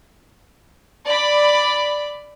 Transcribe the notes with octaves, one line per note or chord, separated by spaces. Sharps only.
D5 B5